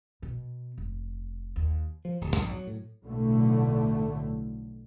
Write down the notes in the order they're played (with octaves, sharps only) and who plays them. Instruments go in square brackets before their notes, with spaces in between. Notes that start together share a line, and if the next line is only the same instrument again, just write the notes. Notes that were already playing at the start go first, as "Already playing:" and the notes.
[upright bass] B2
F1
D#2
[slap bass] F3
D1
A#1 F2 G#2
F#3
A2
[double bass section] B1 A2 D3 A3